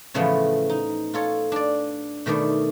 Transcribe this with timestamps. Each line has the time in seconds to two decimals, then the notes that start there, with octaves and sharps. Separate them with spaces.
0.14 A2 C#3 E3 F3 A3 B3
0.69 D#4
1.14 F4 A4 C#5
1.52 D4 D5
2.26 B2 D#3 A3 D5